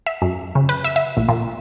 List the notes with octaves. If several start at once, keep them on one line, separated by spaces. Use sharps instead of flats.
E5
F#2
C#3
B4
E5
E5
A#1
A#2